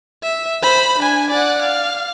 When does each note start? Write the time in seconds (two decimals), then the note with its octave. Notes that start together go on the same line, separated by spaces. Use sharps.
0.23 E5
0.63 C5 B5
0.99 D4 G#5
1.30 D5 F#5
1.62 F5